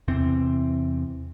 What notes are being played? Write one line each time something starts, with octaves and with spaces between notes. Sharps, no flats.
E2 C3 E3 C4